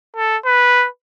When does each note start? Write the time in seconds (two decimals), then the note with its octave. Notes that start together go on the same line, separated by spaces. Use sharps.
0.16 A4
0.45 B4